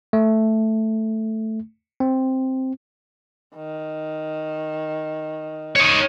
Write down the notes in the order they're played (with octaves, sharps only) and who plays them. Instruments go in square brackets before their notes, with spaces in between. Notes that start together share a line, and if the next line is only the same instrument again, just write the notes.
[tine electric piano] A3
C4
[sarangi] D#3
[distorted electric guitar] D#4 C#5